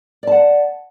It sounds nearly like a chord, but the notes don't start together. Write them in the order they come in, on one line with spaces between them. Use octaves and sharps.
D5 A5 F#5